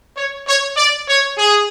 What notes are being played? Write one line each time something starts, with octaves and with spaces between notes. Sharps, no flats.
C#5
C#5
D5
C#5
G#4